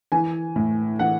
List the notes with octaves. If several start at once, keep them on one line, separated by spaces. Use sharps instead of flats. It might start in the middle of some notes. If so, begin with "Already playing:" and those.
E3 G#5
A2
E3 F#5